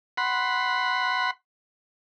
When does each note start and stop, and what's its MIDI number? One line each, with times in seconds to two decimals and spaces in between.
0.17 1.31 78
0.17 1.31 83
0.17 1.31 84